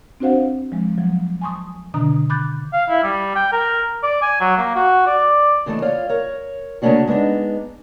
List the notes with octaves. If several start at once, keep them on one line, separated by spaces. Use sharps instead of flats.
C4 D4 F#4 C5 F5 F#5
F3 G#3
F3 F#3
G#5 A5 C6 C#6 D#6
B2 D3 D#3 D4 A#5 D#6
B5 D6 F#6 G6 A6
F5
E4
G3
G5
A#4
D5
G#5
F#3
A#3
F#4
D5
C#3 E3 A3 A4 D#5
F4 C#5 D5 F5
A#4 C#5
C#3 A3 A#3 C#4 D4 F#4
G#3 A3 B3 D4 D#4